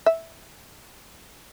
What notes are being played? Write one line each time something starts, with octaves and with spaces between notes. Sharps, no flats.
E5